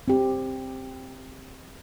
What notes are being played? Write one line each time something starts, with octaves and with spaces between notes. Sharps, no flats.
C4 G4